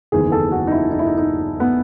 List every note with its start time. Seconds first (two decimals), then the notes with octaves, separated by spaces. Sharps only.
0.12 F#1 E2 D#3 G#4
0.32 A4
0.52 F#4
0.67 D#4
0.72 E4
0.92 D#4
0.99 E4
1.07 D#4
1.18 D#4
1.60 B3